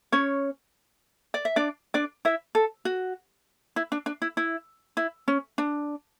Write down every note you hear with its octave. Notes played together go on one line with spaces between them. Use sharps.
C#4 C#5
D5
E5
D4 D5
D4 D5
E4 E5
A4
F#4
E4
D4
D4
E4
E4
E4
C#4
D4